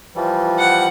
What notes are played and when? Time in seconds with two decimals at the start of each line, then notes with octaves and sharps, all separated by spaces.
0.16 E3 F3 G3
0.59 F#5